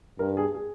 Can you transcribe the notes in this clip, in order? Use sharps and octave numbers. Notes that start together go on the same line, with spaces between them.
G2 A#4
G#4
G#4